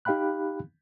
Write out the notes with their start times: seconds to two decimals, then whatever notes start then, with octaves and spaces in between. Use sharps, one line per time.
0.05 D#4 G4 F5 G5 B5 F#6